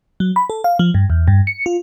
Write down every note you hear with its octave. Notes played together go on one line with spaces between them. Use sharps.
F#3
B5
A4
F5
F3
G2
E2
G2
C#7
F4